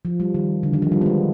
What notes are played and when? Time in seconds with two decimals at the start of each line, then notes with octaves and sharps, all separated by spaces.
0.05 F3
0.20 G3
0.34 D#3
0.63 D3
0.73 D#3
0.82 F3
0.92 G3
1.01 B3
1.06 G#3